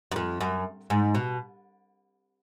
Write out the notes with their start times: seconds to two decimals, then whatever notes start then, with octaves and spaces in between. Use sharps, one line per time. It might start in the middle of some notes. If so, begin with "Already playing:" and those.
0.12 F#2
0.16 F2
0.41 F#2
0.90 G#2
1.15 B2